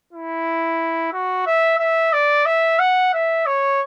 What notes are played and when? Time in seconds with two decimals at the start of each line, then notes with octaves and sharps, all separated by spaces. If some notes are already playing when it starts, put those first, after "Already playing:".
0.13 E4
1.13 F#4
1.47 E5
1.79 E5
2.13 D5
2.46 E5
2.80 F#5
3.13 E5
3.46 C#5